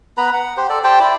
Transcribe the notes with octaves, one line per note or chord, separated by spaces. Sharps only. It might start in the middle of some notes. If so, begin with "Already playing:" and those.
B3 B4 A#5 B5
F#5
G4 C5
A4 D5
G4 C5 G5 A5
E4 D5